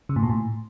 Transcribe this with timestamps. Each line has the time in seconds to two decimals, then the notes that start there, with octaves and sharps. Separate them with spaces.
0.09 C#3
0.16 A2
0.23 A#2
0.30 A2